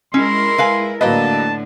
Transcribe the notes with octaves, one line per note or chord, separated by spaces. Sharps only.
G#3 C#4 E4 A#4 C6
B4 F5 G#5
A2 D3 F#3 A#3 B4 D#5 A5